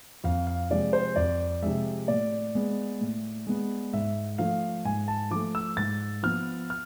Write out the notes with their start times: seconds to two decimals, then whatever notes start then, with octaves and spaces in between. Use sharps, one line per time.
0.24 F2 F5
0.47 F5
0.70 C3 F3 G#3 D5
0.93 C5
1.16 F2 D5
1.63 C3 F3 G#3 E5
2.08 A2 D5
2.55 G#3 B3
3.01 A2
3.47 G#3 B3
3.93 G#2 E5
4.38 F3 A3 F5
4.85 G#2 G#5
5.08 A5
5.31 F3 A3 D6
5.55 E6
5.77 G#2 A6
6.23 F3 B3 F6
6.70 F6